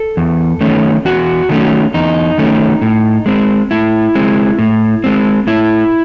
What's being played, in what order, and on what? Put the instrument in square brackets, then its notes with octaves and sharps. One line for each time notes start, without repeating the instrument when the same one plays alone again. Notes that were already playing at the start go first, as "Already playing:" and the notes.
Already playing: [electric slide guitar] A4
E2
D#3 A3 C#4
E2 F#4
D#3 A3 C#4
E2 D#4
D#3 A3 C#4
A2
G#3 C4
A2 E4
G#3 C4
A2
G#3 C4
A2 E4